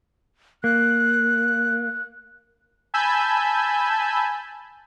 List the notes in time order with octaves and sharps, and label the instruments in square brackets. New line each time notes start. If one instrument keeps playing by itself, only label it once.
[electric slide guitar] A#3 [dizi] F#6
[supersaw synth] G#5 A5 B5 E6 G6